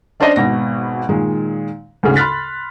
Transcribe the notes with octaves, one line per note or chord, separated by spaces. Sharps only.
C#4 D4 C5 D5 D#5 A5
G#1 B2 A#6
A#2 D#3 G#3
D2 G#2 C#3
B5 C6 F6 F#6 A6 B6